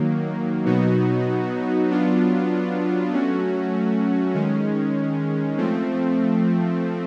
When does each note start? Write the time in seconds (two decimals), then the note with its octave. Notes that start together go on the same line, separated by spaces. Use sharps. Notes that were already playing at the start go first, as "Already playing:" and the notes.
Already playing: D#3 F#3 A#3
0.65 B2 F#3 B3 D#4 F#4
1.88 F#3 B3 D4 F4
3.11 F#3 A3 C#4 F#4
4.34 D#3 G#3 C#4
5.58 F3 A3 C4